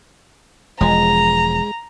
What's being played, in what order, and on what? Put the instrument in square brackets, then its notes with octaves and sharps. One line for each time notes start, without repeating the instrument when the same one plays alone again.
[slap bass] E1 F3 [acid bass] G#3 [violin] A#5